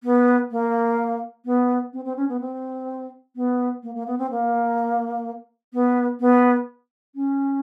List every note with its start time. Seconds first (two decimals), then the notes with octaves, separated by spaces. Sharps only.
0.03 B3
0.51 A#3
1.45 B3
1.93 C4
2.04 C4
2.17 C#4
2.29 B3
2.40 C4
3.35 B3
3.83 A#3
3.95 A#3
4.07 B3
4.18 C4
4.31 A#3
5.73 B3
6.20 B3
7.15 C#4